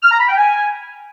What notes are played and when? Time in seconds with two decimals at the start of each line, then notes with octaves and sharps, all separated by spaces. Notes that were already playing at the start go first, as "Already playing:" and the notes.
0.03 F6
0.11 A#5
0.20 B5
0.28 G5
0.37 G#5